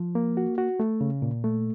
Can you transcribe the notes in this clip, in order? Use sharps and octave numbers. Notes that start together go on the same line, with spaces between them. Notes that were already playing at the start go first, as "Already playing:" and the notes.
Already playing: F3
A#3
F#4
F#4
A3
C#3
A#2
A3